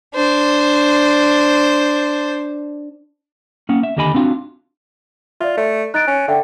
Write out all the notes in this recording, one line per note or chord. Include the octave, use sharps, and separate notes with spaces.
D4 C5
A#3 C#4 F#5
E5
D#2 D3 G4 D#5 G#5 B5
C4 D4 F4 F#4
F4 D5 E5
A3
D#4 F#6 A6 D7
C#4
D3 A4 E5 G5